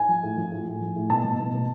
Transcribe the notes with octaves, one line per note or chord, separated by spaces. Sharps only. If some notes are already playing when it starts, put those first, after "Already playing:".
Already playing: G#5
F3
A2
F3
A2
A2
F3
A2
B2 A5
B2
B2
B2